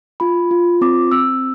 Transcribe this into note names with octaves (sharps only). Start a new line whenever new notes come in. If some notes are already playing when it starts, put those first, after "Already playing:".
F4 B5
F4
C4 D6
C4 E6